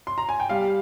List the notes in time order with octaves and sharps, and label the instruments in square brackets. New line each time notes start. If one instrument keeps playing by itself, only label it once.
[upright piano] C6
A#5
G#5
G5
G3 F5